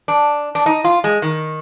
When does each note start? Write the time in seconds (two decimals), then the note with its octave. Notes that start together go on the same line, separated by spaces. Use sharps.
0.08 D4
0.55 D4
0.66 D#4
0.84 F4
1.04 G#3
1.22 D#3